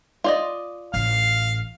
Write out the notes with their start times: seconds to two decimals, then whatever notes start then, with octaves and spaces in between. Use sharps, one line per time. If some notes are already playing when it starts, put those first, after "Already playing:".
0.24 F4 D5 D#5
0.94 A1 F5